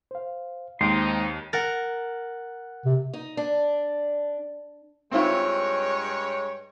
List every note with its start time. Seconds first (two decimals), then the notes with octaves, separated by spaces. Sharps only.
0.11 C5 F5
0.81 D#2 G#3 C4 D#4 C6 D7
1.53 A#4 F#5 F#6 A6
2.85 C3
3.13 D#4
3.37 D4
5.11 G2 G#3 C4 E4 F4 C#5